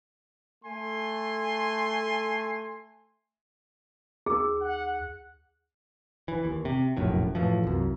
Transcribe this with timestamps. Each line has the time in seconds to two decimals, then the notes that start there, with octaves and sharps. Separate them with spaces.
0.64 A3 G#5 C6
4.26 D#2 G#4 E6
4.60 F#5
6.28 E3
6.45 D#2
6.65 C3
6.97 F1 A#1 F#2 A2
7.35 F#2 A2 E3 F3
7.63 C2 F#2